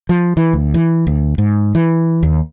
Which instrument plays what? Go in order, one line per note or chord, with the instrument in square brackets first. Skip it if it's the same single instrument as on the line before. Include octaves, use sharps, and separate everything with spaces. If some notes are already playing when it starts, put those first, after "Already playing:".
[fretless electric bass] F3
E3
D2
E3
D2
G#2
E3
D#2